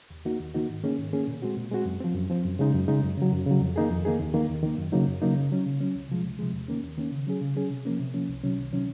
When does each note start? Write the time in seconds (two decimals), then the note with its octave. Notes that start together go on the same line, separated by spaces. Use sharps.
0.10 D#2
0.25 D#3 A#3 D#4 F#4
0.40 D#2
0.54 D#3 A#3 D#4 F#4
0.69 G#2
0.84 D#3 A#3 C#4 G#4
0.98 G#2
1.13 D#3 A#3 C#4 G#4
1.27 A#2
1.42 G#3 C4 F#4
1.57 A#2
1.71 G#3 C4 F#4
1.85 F#2
2.00 F3 C4
2.15 F#2
2.30 F3 C4
2.44 F#2
2.59 C#3 G#3 D#4
2.73 F#2
2.88 C#3 G#3 D#4
3.03 F#2
3.18 C#3 F#3
3.32 F#2
3.46 C#3 F#3
3.61 F2
3.76 D#3 A#3 D#4 G#4
3.90 F2
4.05 D#3 A#3 D#4 G#4
4.20 D#2
4.34 D#3 A#3
4.49 D#2
4.63 D#3 A#3
4.78 F#2
4.92 C#3 F#3 A#3 D#4
5.07 F#2
5.22 C#3 F#3 A#3 D#4
5.37 C#3
5.51 F#3 C#4
5.66 C#3
5.81 F#3 C#4
5.95 C#2
6.09 C3 F3 G#3
6.24 C#2
6.39 C3 F3 G#3
6.53 D#2
6.68 D#3 A#3 C#4
6.83 D#2
6.97 D#3 A#3 C#4
7.12 C#3
7.27 F#3 C#4 G#4
7.41 C#3
7.55 F#3 C#4 G#4
7.70 C3
7.85 F3 A#3 C#4
8.00 C3
8.14 F3 A#3 C#4
8.29 C2
8.44 C3 D#3 F#3 C#4
8.58 C2
8.72 C3 D#3 F#3 C#4